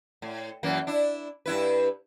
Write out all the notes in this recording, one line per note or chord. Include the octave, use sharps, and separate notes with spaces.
A2
F#2 E3 A#3
D4 E4
G2 E4 B4